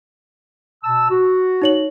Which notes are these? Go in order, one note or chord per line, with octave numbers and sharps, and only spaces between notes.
B2 A5 E6
F#4
D#4 C#5 F#7